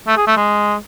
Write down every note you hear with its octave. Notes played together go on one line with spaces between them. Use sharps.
A3
G#4
A3
G#3